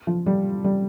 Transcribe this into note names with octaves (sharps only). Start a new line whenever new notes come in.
F3
G3
G3